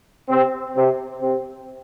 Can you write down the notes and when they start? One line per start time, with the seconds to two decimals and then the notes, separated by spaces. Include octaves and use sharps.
0.28 C3 C4
0.75 C3 C4
1.21 C3 C4